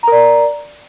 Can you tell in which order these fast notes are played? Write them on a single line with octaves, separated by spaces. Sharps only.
A#5 A#4 D5